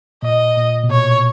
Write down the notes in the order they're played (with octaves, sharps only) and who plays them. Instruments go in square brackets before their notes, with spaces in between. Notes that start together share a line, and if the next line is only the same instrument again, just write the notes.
[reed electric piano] A#2 [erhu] D#5
[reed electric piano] A#2
B2
[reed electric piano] A#2 [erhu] C#5